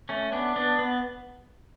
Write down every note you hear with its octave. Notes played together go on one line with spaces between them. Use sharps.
A3 C#4
B3 D4
B3 D4
B3